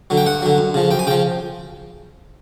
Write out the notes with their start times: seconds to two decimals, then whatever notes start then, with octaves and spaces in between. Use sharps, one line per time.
0.10 D3 F#3
0.17 G5
0.26 G2 F#5
0.42 D3 F#3
0.58 F#2
0.74 C#3 F3
0.91 F#2 G5
0.99 G#5
1.07 C#3 G5
1.11 F3